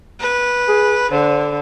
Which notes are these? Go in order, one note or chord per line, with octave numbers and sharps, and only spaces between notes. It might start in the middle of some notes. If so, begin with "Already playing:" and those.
B4
G#4
D3 C5